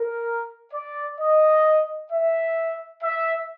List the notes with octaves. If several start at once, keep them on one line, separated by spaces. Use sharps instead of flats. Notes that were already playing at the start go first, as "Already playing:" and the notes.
Already playing: A#4
D5
D#5
E5
E5